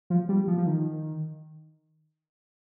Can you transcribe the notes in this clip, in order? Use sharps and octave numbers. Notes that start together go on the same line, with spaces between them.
F3
G3
F3
F3
D#3